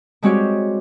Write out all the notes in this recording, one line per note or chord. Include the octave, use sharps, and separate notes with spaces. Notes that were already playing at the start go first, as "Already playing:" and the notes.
G3 G#3 C4 F#4 G4 C#5